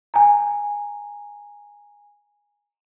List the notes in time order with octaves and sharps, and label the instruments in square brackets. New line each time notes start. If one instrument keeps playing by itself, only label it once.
[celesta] G#5 A#5